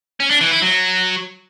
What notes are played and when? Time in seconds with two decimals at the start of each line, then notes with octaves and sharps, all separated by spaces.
0.20 C#4
0.30 D4
0.41 E3
0.51 E4
0.62 F#3